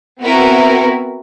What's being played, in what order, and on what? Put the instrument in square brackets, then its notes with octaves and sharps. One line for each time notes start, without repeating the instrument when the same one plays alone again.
[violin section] B3 C4 E4 F#4 A#4 B4